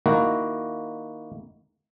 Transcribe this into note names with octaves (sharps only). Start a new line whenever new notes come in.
D#3 A#3 E4 F#4